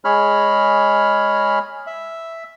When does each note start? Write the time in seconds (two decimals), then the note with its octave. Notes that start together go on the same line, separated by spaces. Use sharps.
0.05 G#3 G#4 C#5 B5 F6
1.87 E5